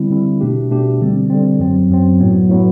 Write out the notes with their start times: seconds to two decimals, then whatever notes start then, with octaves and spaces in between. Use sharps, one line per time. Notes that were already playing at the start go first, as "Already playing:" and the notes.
Already playing: D3 G3 C4 E4
0.11 D3 G3 C4 E4
0.41 B2 A3 D4 G4
0.71 B2 A3 D4 G4
1.01 D3 G3 C4
1.30 D3 G3 C4
1.60 F#2 F#3 C4
1.89 F#2 F#3 C4
2.20 A2 F#3 B3
2.50 A2 F#3 B3